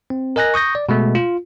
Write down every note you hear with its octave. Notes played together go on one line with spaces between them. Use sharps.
C4
A#4 D#5 G#5 F#6 A#6
C#6 D#6 G6 A#6
D5
B2 G#3 A3
F4